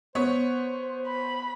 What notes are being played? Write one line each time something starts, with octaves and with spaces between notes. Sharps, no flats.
B3 C5 C#5
B5